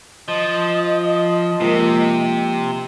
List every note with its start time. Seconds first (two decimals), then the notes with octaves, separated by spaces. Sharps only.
0.28 F3 D#5
1.60 C3 F3 G#3 A#3